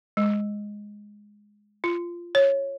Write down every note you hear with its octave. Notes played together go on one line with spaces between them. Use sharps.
G#3
F4
C#5